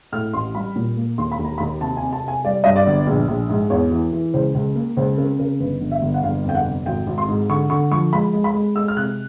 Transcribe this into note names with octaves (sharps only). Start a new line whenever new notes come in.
A2 F6
A1 C6
G3 B5
A#2
A#3
D#2 C6
B5
D#2
A#5
D#2 B5
C3 A5
G#5
C3
A5
C3 G#5
G3 D5
G2 D#5
D5
G1
A#1
A#1
G#2
E2 C#5
E3
E3
C#2 C5
C#2
A#3
C#2 C5
C#3 A#4
C#3 A#4
G1 B4
G1
E5
G1
F#5
G1 F5
F2
G5
F#5
C3
G#1 G5
G#1
C6
G#2
D3 C#6
D3 C#6
F3 C#6
G#3 B5
G#3
B5
G#3
G#3 E6
F6
C3 F#6